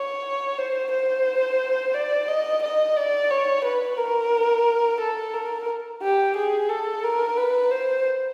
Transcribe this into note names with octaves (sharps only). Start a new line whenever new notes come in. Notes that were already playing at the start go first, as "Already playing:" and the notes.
Already playing: C#5
C5
C5
D5
D#5
D#5
D5
C#5
B4
A#4
A4
A#4
G4
G#4
A4
A#4
B4
C5